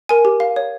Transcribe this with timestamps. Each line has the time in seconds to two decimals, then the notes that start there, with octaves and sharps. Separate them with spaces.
0.09 A#4 G#5
0.25 G4
0.40 F5
0.56 C#5